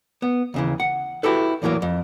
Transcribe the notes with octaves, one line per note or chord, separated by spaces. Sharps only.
B3
D#2 C#3 E3
F#5
E4 F#4 G4 A4 B4
E2 A2 E3 F#3 A#3
F2